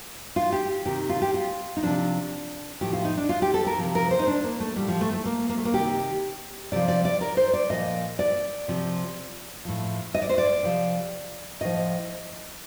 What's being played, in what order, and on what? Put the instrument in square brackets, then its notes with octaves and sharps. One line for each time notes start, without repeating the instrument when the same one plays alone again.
[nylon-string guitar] F4
G4
C3 D#3 G4
F4
G4
F4
D#4
C3 F3 D4
A2 F3 G4
F4
D#4
D4
F4
G4
A4
A#4
C3 F3
A#4
C5
D#4
D4
A#3
A3
A2 F3 G3
F3
A3
A3
A#3
A#3
A3
A#3
C3 D#3 G4
C3 F3 D5
D5
D5
A#4
C5
D5
A#2 F3 D#5
D5
C3 F3
A2 F3
D#5
D5
C5
D5
C3 F3
A2 F3 D#5